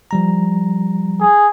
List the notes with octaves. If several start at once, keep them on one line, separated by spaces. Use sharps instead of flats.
F3 G3 A#5
G#4